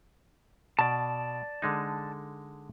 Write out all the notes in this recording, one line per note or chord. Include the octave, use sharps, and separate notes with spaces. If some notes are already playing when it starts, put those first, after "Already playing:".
B2 D5 A5
D3 G#3 D#4